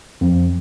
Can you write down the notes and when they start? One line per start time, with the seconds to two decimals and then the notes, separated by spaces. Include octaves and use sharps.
0.21 F2